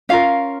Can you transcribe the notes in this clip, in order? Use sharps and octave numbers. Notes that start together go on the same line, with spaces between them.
C#4 F4 A#4 F5